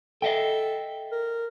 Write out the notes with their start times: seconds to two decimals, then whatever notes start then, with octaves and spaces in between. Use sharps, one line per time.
0.22 A4 D#5 E5 G5
1.12 A#4